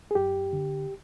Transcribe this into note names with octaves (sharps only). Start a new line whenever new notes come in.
G#4
F#2 G4
D3